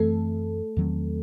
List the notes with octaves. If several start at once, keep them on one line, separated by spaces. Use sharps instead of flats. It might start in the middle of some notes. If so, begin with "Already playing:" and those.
Already playing: F#2 E3 A3 C4 A4
E2 D#3 F#3 C4